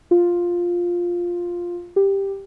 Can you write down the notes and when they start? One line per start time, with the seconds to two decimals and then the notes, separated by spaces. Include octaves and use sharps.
0.11 F4
1.96 G4